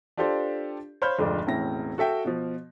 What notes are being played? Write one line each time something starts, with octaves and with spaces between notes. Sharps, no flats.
D4 F4 G4 A4 C5 D5
C5 C#5 F5 B5 F6 G6
F1 F2 G#2 D3 D4 D6
E1 A2 C3 C#4 E4 A#6
F#4 A4 E5 G5
B2 F3